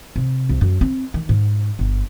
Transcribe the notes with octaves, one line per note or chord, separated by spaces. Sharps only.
C3
C2
F#2
C4
D#3
G#2
G1